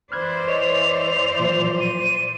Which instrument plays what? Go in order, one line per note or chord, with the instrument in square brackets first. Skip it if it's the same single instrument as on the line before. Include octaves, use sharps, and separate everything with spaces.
[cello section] E3 C5 D5 [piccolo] B5 [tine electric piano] F6 F#6 G#6
[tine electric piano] B4 C#5 D#5 [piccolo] F7
[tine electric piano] A#2 F3 F#3
[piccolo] D#7